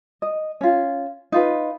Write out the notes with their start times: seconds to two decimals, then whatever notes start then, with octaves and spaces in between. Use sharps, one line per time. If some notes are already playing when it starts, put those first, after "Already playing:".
0.22 D#5
0.61 C#4 F4
1.32 D#4 F4 B4